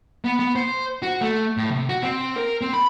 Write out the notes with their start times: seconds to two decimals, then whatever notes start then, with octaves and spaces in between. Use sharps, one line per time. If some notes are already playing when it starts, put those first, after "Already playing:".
0.25 B3
0.40 B3
0.56 C5
1.02 F#4
1.21 A3
1.57 A2
1.71 C3
1.89 F#4
2.03 C4
2.36 A#4
2.61 C4
2.73 B5